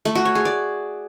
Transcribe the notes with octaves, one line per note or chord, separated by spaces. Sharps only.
A3
F#4
C#5
G#4
D5